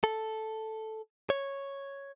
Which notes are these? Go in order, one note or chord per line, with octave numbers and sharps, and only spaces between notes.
A4
C#5